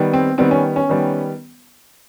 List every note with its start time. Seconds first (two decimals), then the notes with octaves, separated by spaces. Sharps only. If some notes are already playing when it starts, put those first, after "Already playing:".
Already playing: D#3 G3 B3
0.13 C4
0.38 D#3 G3 B3 C4
0.51 C#4
0.76 C#4
0.89 D#3 G3 B3